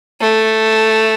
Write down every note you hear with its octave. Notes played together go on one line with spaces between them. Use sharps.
A3